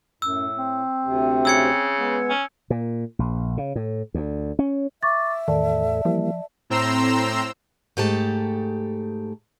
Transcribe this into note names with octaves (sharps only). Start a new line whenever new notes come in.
F#2 A2 E6
C4
D2 C3
C#3 E6 G#6 C#7
G#3 B3
C#4
A#2
A#1
C#3
A2
D2
C#4
E5 C#6 D6 A6
E2 A2 D#3 A4 D5 A5
E3 F3 G3 A#3
A2 C4 A#5 C6 E6
G#2 A3 G4 A5